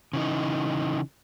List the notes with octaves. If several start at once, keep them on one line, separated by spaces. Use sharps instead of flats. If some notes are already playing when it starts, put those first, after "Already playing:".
C#3 E3 D#4